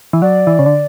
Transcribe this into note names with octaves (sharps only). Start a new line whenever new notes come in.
E3
F#3 D5
E3
C#3
D3